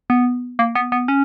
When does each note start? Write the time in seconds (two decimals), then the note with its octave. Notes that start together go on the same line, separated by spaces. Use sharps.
0.10 B3
0.59 A#3
0.75 B3
0.92 B3
1.08 C#4